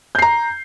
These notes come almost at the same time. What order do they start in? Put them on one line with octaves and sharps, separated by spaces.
G6 C7 A#5